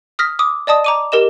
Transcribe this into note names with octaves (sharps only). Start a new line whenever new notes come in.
D#6 F6 A#6 B6
D6 D#6
D5 D#5 A5 D#6
A#5 D6 D#7
G4 A#4 D#5 E7